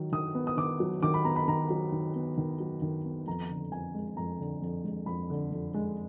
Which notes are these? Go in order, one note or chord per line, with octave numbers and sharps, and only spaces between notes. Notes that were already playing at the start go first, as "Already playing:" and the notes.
Already playing: D#3 F#3
D#3 D#6
B3
D#6
D#3 D6
F#3
D#3 D6
B5
B3 A#5
B5
D#3 A#5
F#3
D#3
B3
D#3
F#3
D#3
B3
F2 A#5
D3
F2 G#5
G#3
F2 A#5
D3
F2
G#3
F2 B5
D3
F2
G#3